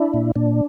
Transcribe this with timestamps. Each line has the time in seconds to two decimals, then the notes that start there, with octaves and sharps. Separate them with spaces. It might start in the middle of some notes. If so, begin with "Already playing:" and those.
Already playing: D4 E4
0.14 A#2
0.36 A#2 D4